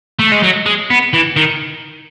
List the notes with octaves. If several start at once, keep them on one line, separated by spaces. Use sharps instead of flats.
A3
G#3
F#3
G#3
B3
E3
D#3